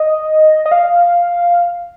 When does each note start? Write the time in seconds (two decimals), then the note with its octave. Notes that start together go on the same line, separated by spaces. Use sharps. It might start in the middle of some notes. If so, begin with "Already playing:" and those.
Already playing: D#5
0.66 D#5
0.72 F5